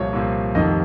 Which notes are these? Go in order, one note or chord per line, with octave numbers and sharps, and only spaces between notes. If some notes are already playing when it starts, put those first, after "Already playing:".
Already playing: C2 A#2 F3 C#5
C2 A#2 F3
F1 F2 D#3 D#5